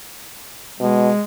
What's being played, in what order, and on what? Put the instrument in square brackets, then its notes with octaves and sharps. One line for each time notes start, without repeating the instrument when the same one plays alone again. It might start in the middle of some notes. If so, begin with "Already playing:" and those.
[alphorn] B2 [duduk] G#3